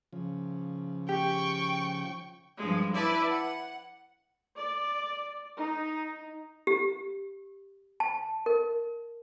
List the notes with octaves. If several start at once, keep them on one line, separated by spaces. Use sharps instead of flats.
C#3 F3
G4 G5 C#6
G2 F3 G#3
E4 B4 D5 A5
F#5
D5
D#4
G4
A5
A#4